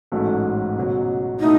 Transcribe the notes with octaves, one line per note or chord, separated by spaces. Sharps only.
A1 G#2 F#3 A3
C#2 B2 F#3
B2 A3 D#4 E4